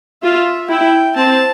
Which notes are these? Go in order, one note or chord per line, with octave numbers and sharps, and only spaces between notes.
F4 E5
E4 G5
C4 A5